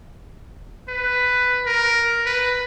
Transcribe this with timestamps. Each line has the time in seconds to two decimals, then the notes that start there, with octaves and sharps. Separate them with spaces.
0.88 B4
1.66 A#4
2.26 B4